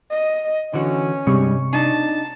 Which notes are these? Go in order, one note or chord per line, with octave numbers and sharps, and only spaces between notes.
D#5
D3 E3 C#4 F#4
G2 C3 G3 G#3 C#6
D4 D#4 A5